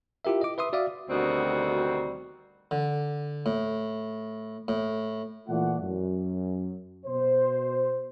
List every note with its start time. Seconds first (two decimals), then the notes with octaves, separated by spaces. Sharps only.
0.25 E4 F4 G4 A#4 E5
0.41 D#5 D6
0.58 B4 E5 C6 D#6
0.73 F#4 D5 E5 F5 D6 D#6
1.09 D2 B2 D#3 G3 C4 F#4
2.71 D3
3.46 A2
4.68 A2
5.48 A#2 E3 A3 F4 D5 F#5
5.81 F#2
7.06 B2 C5